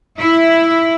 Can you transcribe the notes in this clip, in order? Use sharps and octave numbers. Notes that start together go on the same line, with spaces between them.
E4